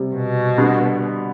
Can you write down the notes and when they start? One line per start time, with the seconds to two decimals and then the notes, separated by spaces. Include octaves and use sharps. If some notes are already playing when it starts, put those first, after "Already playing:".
Already playing: C3 G3 C4
0.15 B2
0.58 D3 G3 B3